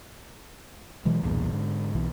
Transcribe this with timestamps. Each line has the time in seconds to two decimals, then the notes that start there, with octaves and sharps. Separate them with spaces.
1.05 B2 E3 F#3 G#3
1.23 B1 E2 G2 A#2
1.53 G#2 D3
1.95 B1 E3